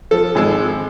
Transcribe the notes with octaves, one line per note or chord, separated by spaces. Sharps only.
F3 A4
G#1 G#3 E6